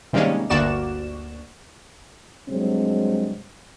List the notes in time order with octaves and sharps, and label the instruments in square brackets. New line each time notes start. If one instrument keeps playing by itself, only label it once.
[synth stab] C3 D#3 G3 G#3 A#3 C#4
G1 D2 A#3 F#4 D5 E7
[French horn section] G2 C3 F#3 G#3 C4